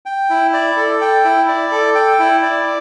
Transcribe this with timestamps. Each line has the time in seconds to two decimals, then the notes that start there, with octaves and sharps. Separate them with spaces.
0.06 G5
0.30 E4
0.53 D5
0.77 A4
1.01 G5
1.24 E4
1.48 D5
1.72 A4
1.95 G5
2.19 E4
2.42 D5